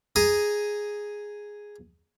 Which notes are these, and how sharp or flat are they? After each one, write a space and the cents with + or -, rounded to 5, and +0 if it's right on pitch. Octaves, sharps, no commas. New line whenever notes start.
G#4 +0 A#5 +0 D#6 +0